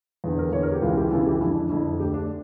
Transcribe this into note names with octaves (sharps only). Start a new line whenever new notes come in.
E2 D3
A#4
E2 D3 C#5
A#4
G4
C#2 C#3 E3 F4
G4
C#2 C#3 E3 A4
G4
F2 D3 E4
D4
F2 D3 E4
D2 D3 G4
D4